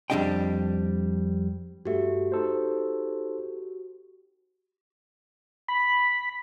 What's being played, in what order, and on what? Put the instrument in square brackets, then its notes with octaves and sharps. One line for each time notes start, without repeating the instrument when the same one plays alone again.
[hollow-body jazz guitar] F2 E3 G3 D4 D#5 G5
[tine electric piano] G2 A3 [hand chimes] F#4 G4
[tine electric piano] D#4 A4 C5
[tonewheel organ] B5